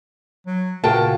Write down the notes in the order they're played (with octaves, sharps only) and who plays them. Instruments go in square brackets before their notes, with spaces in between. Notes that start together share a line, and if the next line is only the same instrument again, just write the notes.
[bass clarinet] F#3
[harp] A#2 F4 F#4 [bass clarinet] C#3 [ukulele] A#4 B4 G5 [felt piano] A5